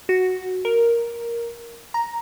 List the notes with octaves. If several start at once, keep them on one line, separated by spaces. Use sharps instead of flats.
F#4
A#4
A#5